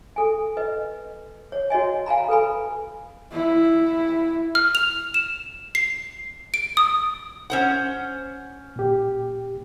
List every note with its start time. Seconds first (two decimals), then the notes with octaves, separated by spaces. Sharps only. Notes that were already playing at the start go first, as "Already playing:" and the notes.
0.16 A4 G#5
0.57 B4 D#5
1.52 C#5
1.70 F#4 C#5 D#5 G#5
2.06 F5 G#5 A#5 B5
2.28 A4 B4 G#5 B5
3.32 E4
4.55 F6
4.75 F7
5.14 E7
5.75 C7
6.54 D7
6.77 D#6
7.50 C#4 C5 F#5
8.76 A#2 G4